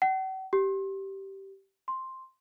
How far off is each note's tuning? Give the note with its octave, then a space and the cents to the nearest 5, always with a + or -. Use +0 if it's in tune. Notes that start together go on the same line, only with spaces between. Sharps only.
F#5 +45
G4 -15
C6 +5